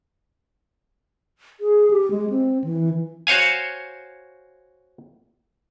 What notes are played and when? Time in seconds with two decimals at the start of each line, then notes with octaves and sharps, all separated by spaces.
1.60 G#4
1.91 G4
2.11 G#3
2.30 C4
2.64 E3
3.27 F#4 C5 C#5 F5 G#5